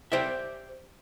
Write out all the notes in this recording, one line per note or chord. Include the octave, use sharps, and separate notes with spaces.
G4 C5 D5 E5